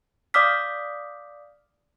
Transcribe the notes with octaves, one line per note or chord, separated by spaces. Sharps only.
D5 F5 D6 D#6 F6 B6